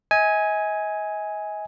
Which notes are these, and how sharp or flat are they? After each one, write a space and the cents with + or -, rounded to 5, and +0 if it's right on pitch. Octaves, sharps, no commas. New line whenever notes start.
D#5 +40 G#5 +0